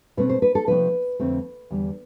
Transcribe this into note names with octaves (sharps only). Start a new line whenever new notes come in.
B2 A3 C4 B4
C5
B4
A4
C3 F3 A3 D4 B4
F2 D3 A3 C4
E2 D3 G3